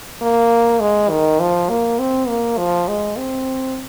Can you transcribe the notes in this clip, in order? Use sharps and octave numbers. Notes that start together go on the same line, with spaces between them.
A#3
G#3
D#3
F3
A#3
C4
A#3
F3
G#3
C4